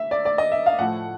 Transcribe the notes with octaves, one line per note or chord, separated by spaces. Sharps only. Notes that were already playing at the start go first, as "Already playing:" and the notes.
Already playing: E5
D5
D5
D#5
E5
F5
A2 F3 A3 F#5